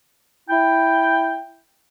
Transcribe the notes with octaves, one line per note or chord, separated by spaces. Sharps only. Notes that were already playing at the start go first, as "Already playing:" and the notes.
E4 G5